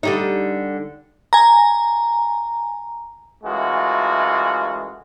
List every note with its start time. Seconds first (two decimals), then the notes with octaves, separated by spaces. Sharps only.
0.03 D3 G3 D#4
1.33 G#5 A#5
3.44 F#2 E3 G#3 A3 F4 F#4